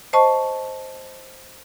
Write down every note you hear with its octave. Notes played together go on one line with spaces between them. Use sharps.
C5 D#5 A5 C#6